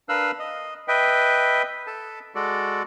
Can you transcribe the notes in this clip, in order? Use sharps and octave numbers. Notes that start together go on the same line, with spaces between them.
D4 A#4 B4 F5 E6 F#6
D#5
B4 D#5 E5 G5
A4 A5
G#3 F#4 A4 D5